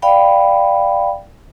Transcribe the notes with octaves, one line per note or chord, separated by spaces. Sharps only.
D5 F5 G5 B5